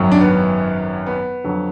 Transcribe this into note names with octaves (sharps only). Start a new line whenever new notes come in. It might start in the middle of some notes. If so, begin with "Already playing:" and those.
Already playing: G#1 F#2 D#3 F#3
D4
B3
B3
F2 D3 F#3